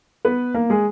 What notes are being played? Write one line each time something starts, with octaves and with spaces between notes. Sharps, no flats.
B3 B4
A#3 A#4
G#3 G#4